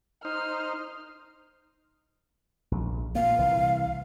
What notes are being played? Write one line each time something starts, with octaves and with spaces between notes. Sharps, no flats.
D#4 C5 F6
A#1
A#2 A#3 F5
C2 E3